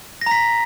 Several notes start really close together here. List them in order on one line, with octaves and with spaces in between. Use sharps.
A#6 A#5 B6